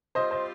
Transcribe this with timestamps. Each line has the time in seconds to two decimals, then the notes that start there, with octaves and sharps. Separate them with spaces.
0.15 G3 C4 F4 C5 D#5
0.31 C5 D#5